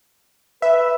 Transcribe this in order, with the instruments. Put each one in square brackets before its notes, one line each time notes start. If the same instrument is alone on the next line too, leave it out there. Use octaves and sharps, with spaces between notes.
[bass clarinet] B4 [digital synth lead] E5